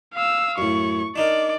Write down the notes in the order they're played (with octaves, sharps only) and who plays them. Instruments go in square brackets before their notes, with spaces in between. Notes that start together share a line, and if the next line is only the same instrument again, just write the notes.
[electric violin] F5 E6
[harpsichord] F#2 A2 [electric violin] C#6
[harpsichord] D4 D#4 A#4 [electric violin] D5